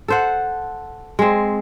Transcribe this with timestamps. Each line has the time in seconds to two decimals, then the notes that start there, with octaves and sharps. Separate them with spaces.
0.08 A4 C5 F#5
1.19 G#3 C4